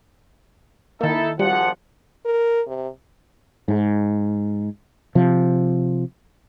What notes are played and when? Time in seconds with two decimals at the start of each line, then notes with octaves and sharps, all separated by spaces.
1.01 D#3 A#3 D#4 E4 A4
1.39 G#1 F3 G3 F#5
2.25 A#4
2.67 C3
3.68 G#2
5.15 C3 F3